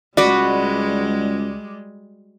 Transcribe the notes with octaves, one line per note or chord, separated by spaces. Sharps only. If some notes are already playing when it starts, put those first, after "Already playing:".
C#2 G3 G#3 F#4 B4 D5 D#5